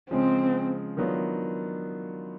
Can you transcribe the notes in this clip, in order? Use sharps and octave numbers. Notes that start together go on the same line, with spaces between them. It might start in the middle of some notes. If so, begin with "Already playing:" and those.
C#3 F3 G#3 C4
D#3 F#3 B3 D4 F4